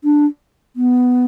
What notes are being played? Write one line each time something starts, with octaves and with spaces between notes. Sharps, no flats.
D4
B3